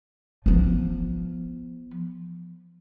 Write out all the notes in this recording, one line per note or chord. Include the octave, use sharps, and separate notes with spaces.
F3 B3